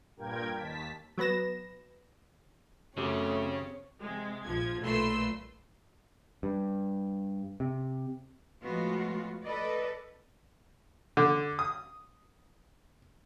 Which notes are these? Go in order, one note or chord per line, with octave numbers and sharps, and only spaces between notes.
G2 A#2 A#4 G5 G#6
D#2 A5 B6
F#3 B3 B4 A#6 E7
F#2 C#3 A3 C4 G4 C#5 D6
C3 G#3
A#1 F3 G#6
B1 A#2 A3 B4 C6 E6
G2
C3
A2 F3 G#3 B3 F4 F#4
A4 B4 D5 D#5
D3
D#6